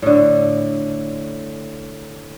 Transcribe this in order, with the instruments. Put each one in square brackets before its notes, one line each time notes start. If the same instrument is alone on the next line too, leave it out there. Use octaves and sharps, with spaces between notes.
[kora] A2 D3